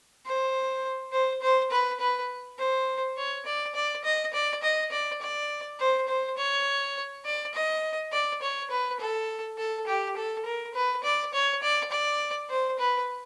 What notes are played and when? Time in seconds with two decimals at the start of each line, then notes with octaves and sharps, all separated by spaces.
0.25 C5
1.12 C5
1.42 C5
1.71 B4
2.00 B4
2.58 C5
3.17 C#5
3.46 D5
3.75 D5
4.04 D#5
4.33 D5
4.63 D#5
4.91 D5
5.21 D5
5.79 C5
6.08 C5
6.37 C#5
7.25 D5
7.54 D#5
8.12 D5
8.42 C#5
8.71 B4
9.00 A4
9.58 A4
9.87 G4
10.16 A4
10.45 A#4
10.75 B4
11.04 D5
11.33 C#5
11.62 D5
11.91 D5
12.50 C5
12.79 B4